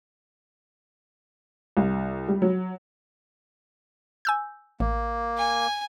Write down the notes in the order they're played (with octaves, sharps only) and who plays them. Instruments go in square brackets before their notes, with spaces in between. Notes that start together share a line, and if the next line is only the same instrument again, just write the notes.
[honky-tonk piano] C2
G3
F#3
[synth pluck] G#5 E6 G6
[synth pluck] A1 [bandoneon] A#3
[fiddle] G#5